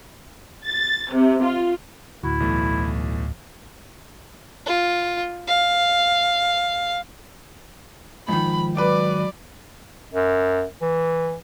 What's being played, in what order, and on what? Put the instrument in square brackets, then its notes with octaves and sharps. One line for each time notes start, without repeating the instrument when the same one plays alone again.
[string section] A6
C3
F4
[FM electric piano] D2 A2 [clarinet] E4 [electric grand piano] F#4
[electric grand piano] B1 E3 A3
[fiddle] F4
F5
[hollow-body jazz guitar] G#2 D#3 [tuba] F3 [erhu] B5
[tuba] F#3 [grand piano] B4 D6 [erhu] D5
[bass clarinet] F#2
E3